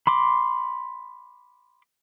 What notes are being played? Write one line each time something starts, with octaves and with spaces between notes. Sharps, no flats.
B5 C6 D6